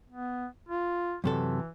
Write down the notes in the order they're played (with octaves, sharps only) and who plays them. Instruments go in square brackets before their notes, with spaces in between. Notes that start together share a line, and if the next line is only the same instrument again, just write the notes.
[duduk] B3
F4
[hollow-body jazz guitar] F#2 C3 A4 [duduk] E3